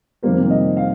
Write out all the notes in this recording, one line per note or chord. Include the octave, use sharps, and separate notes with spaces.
F2 C3 D#3 G3 A#3 C5
D#5
F5